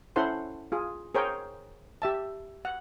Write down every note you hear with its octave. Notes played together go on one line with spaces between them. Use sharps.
C#4 E4 A4 C5 F#5 C6
F4 G#4
G#4 A#4 C5 C#5 G5
G4 E5 A5
F#5